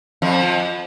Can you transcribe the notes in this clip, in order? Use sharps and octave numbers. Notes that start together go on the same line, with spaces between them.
F2 F3